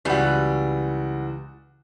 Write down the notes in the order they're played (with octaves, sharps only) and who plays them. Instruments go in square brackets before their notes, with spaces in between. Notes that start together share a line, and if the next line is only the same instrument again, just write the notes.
[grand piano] C#2 F#4 [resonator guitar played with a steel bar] E3 G3 B4